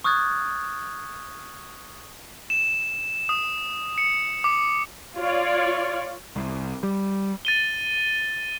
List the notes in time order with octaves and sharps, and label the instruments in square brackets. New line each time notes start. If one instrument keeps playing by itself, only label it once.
[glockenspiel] C#6 D#6 F6 F#6 G#6 A6
[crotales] E7
D#6
C#7
D6
[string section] F4 C#5 D5
[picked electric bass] C2
G3
[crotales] A6 D#7 G7